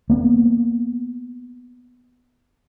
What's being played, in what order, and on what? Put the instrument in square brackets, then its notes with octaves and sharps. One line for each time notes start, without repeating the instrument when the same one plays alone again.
[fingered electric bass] A#3 B3